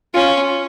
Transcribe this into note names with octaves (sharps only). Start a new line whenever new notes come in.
C#4 F4